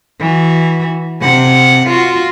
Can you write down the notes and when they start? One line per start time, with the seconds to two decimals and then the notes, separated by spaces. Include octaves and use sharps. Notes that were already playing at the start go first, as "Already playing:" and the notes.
0.20 E3 F#4
1.21 C3 F#5
1.87 F4 F#4